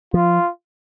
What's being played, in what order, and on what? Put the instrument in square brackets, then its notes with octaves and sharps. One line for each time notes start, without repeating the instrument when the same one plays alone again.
[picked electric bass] F3 [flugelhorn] F4